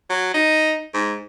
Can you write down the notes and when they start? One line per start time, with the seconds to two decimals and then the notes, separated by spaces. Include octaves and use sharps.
0.09 F#3
0.34 D#4
0.94 G#2